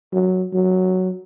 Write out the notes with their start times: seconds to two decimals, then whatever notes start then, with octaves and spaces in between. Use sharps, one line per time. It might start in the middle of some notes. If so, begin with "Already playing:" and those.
0.13 F#3
0.53 F#3